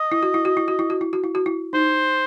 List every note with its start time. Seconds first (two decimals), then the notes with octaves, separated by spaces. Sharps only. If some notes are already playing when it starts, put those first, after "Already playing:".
Already playing: D#5
0.12 E4
0.23 F#4
0.34 E4
0.45 F#4
0.57 E4
0.68 F#4
0.79 E4
0.90 F#4
1.01 E4
1.13 F#4
1.24 E4
1.35 F#4
1.46 E4
1.73 D#4 C5